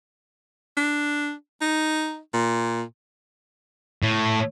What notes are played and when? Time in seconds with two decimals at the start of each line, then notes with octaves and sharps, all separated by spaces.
0.77 D4
1.61 D#4
2.34 A#2
4.03 A2